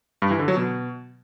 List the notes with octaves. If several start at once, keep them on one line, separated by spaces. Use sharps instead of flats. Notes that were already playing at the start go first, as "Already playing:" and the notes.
G2
E3
D3
F#3
B2